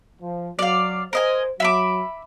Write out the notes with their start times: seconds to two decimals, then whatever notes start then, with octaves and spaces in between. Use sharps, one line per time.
0.22 F3
0.59 F#3 D5 F5
1.13 A#4 C5 D#5 G#5
1.60 F#3 E5 B5 D6